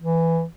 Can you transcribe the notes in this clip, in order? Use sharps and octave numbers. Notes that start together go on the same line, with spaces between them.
E3